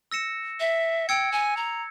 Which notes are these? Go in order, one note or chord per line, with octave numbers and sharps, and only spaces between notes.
E6 A#6 C#7 E7
E5
G5 E6 G#6 C#7
G#5
A#5